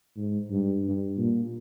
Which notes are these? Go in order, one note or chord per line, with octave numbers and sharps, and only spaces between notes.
G#2
G2
G2
A#2